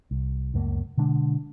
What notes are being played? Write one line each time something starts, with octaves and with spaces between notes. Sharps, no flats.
C2
C#2 F#2 A3 A#3
B2 D3 G#3 D4